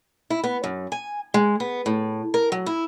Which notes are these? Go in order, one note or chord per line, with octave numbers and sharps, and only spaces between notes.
E4
B3
F#2
G#5
G#3
B3
A2
A#4
F#3
E4